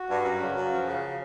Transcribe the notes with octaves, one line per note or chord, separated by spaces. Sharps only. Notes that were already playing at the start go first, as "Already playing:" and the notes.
Already playing: F#4
G2
F#2
C#3
F#2
F3
C#3